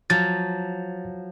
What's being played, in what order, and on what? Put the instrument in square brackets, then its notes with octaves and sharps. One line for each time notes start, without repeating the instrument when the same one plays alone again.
[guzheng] F3 F#3 [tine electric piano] A6